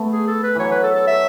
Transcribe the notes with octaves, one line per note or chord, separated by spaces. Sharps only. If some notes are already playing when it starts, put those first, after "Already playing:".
Already playing: A3 B3
G#4
A4
B4
E3 F#3 C#5
B4
A4
A4
E5